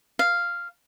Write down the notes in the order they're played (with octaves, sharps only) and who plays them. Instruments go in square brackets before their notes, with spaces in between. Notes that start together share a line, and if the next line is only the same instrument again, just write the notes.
[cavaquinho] F5